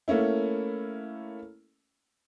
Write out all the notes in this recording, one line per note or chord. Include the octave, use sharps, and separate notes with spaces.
A3 A#3 C#4 E4